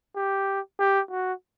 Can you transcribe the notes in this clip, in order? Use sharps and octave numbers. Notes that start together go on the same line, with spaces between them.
G4
G4
F#4